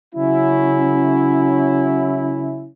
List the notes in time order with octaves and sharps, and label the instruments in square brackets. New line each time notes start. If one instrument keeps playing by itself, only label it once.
[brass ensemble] C#3 F#3 C#4 E4